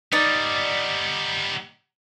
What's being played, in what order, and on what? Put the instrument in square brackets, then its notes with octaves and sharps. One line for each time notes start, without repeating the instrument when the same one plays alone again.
[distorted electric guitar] G3 B3 [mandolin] D#4 D5